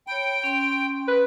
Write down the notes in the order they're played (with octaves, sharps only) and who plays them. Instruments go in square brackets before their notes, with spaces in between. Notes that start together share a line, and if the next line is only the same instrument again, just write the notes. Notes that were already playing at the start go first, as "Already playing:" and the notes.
[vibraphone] C#5 B5 [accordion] G5
[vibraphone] C#4 C6
[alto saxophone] B4